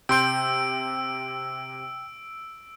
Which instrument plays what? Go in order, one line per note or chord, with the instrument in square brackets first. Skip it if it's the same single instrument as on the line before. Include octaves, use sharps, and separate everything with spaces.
[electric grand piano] C3 C6 G6 [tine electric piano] G5 [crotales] E6 D7